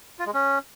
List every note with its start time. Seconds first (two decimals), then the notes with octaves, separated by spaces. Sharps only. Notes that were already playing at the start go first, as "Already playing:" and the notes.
0.19 F4
0.26 G#3
0.34 C#4